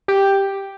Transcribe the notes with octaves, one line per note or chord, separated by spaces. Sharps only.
G4